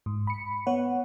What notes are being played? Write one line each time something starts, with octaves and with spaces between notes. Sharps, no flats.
G#2
B5 C#7
B3 C#5 F#5